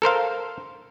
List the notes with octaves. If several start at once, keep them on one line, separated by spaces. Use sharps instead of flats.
A4 A#4 C5 F5